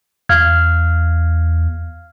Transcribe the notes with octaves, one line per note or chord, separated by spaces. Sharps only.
E2 F5 F6 G#6